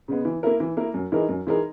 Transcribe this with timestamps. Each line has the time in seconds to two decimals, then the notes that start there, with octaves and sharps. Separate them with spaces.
0.08 C#3 G#3 B3
0.25 E3
0.43 A#3 E4 A#4
0.60 E3
0.77 A#3 E4 A#4
0.94 F#2
1.12 E3 G#3 D#4 A#4
1.29 F#2
1.47 E3 G#3 D#4 A#4